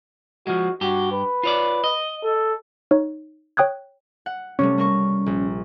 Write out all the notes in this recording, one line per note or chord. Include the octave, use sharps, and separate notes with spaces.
F3 G#3 F#4
G2 F#4 G4
B4
F4 C#5 D5
D#5
A4
D#4 C#5
C#5 G5 D#6 F#6 G#6
F#5
C3 G3 A3 C#4
A#3 A#4 C#6
A#1